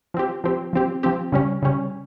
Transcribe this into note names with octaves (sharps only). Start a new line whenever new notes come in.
F3 C4 G4
F3 C4 G4
F3 C4 G4
F3 C4 G4
C#3 G3 C#4
C#3 G3 C#4